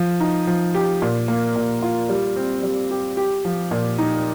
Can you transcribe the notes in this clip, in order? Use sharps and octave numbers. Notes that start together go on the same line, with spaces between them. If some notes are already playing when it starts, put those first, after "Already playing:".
Already playing: F3
D#4
F3
G4
A#2
A#3
A#2
F4
G3
C4
G3
G4
G4
F3
A#2
D#4